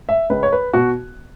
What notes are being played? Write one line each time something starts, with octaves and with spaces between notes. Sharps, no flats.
E5
C#2 B4
C#5
B4
B2 F#4